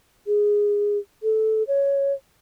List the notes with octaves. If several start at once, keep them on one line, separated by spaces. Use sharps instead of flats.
G#4
A4
C#5